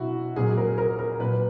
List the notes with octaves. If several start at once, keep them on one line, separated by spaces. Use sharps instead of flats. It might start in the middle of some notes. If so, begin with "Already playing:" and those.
Already playing: B2 F#3 E4 F#4
A#2 F#3 G#4
A#4
A#4
A#4
A#2 F#3 B4